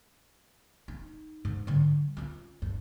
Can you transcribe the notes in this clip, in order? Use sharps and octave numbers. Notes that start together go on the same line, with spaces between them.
D#4
G#2
D3 G3
C#4 F4
G2